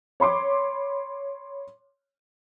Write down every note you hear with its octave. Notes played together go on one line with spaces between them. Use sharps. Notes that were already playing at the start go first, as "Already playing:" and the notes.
C#5 B5 C6 D6